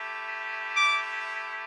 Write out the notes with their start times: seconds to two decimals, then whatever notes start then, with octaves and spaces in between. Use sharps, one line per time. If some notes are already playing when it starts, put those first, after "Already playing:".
Already playing: A3 E4 G4
0.76 D6